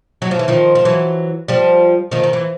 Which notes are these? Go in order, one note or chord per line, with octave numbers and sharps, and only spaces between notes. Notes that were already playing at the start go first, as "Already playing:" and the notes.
F#3
F3
E3
D#3 F3
F3
E3 F#3
F3 G3
D#3 F3
D#3
E3